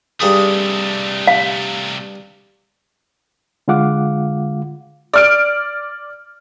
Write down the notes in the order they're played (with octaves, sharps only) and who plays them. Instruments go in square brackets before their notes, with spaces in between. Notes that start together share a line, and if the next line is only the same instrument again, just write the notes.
[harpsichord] G2 G#4 D#6 [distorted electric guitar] C3 A3
[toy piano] F5
[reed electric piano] D3 G#3 F4 F5 F#5 D6
[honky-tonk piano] D5 F6 D7